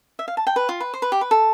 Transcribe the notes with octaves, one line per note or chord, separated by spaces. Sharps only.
E5
F5
A5
G5
B4
F4
B4
C5
B4
G4
B4
A4